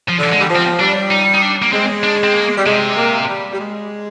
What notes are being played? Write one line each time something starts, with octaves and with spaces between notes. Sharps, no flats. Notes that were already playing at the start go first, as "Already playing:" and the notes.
F3
D3
G#3
G3
F3
C4
G3 D4
D#4
D#4
D4
A#3
G#3 C4
D4
C4
A#3
G3
C3 G#3
A#3
G3
G3
G#3